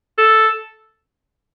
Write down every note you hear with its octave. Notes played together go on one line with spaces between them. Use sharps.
A4